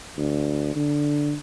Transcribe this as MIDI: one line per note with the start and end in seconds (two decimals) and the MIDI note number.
0.17 0.72 38
0.76 1.34 50